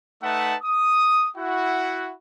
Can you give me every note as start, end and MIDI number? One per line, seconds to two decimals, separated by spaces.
0.23 0.55 57
0.23 0.55 63
0.23 0.55 71
0.23 0.55 76
0.23 0.55 78
0.23 0.55 81
0.63 1.28 87
1.37 2.13 64
1.37 2.13 66
1.37 2.13 78